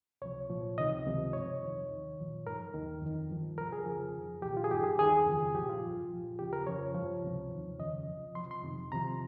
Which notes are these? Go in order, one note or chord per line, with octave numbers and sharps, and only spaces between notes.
C#2 C3 F3 C#5
C2 A#2 F3
C#2 C3 D#3 D#5
C#2 C3 F3
G2 F3 C#5
F2 C3 D#3
D#2 D#3
C2 A#2 F3
G2 D#3 A#4
D#2 D#3
F2 D#3
G2 F3
C2 C3 F3 A#4
G#4
F2 C#3 F3
F2 D#3
C2 A#2 F3 G4
F4
G#4
G2 D#3 G4
G#4
D#2 D#3 G#4
F2 C#3 F3
C2 A#2 F3 G4
F4
G2 F3
C2 A#2 F3
D#2 C#3 F3 G4
A#4
F2 C#3 F3 C#5
G2 F3
C#2 C3 F3
D#2 D#3
F2 C#3 F3 D#5
C2 C3 F3
C2 C3 F3 C6
C6
F2 C3 D#3
C2 C3 F3 A#5